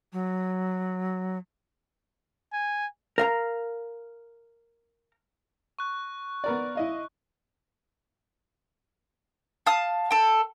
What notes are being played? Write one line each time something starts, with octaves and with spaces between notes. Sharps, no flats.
F#3
G#5
A#4 F5 A#5
C#6 F#6
B3 A#4 D5
E4 D#5 F5
F5 A5 D#6
A4 G5